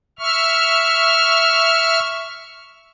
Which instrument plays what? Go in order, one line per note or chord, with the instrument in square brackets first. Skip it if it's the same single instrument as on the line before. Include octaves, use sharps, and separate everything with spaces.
[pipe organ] E5 C#6 F6